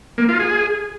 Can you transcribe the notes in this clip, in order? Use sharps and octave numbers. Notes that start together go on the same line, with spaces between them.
A#3
F4
G#4